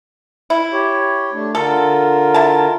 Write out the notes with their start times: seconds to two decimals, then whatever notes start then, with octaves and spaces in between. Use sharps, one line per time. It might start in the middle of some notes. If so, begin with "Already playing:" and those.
0.50 E4
0.73 G4 C#5
1.33 A3 D4
1.55 D3 F4 A4 A#4
2.34 E4 A5